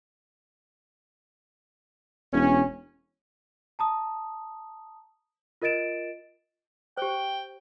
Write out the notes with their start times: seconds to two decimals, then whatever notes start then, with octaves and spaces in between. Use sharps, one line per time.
2.33 E1 C#4
3.79 A5 A#5 D#6
5.62 F4 A#4 D#5 A6 D7 E7
6.97 G4 C5 G5